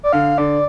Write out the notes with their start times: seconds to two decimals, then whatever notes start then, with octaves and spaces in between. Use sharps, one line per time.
0.03 D5
0.13 D3 F5
0.38 D3 D5